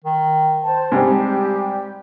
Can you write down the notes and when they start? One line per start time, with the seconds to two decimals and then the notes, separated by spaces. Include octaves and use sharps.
0.04 D#3
0.63 C5 A5
0.92 G#2 C3 G3 G4